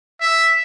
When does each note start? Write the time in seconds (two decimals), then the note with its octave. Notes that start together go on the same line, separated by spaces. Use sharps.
0.21 E5